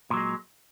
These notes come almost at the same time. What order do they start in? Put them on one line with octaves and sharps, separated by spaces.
A#2 F#3 G#3